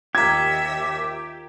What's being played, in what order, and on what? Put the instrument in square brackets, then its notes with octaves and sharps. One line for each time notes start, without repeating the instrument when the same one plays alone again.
[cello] D#2 E5 [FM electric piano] F4 A#4 [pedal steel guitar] G4 [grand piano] G#6